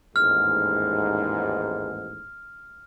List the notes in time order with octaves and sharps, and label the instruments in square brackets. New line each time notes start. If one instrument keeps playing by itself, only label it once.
[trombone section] A1 D#2 G#2 [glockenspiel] F6